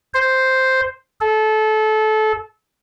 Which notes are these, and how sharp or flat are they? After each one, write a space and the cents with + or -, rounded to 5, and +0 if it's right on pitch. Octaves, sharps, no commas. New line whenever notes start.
C5 +0
A4 -25